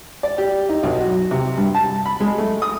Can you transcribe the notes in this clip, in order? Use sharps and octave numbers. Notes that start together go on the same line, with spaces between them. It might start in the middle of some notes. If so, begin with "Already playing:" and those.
D5
G4
D#4
B1
F#4
C3
G2
A5
B5
G#3
A3
D#6